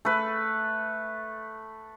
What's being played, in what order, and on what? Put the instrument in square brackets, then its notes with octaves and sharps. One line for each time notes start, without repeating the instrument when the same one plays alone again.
[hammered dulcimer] A3 B4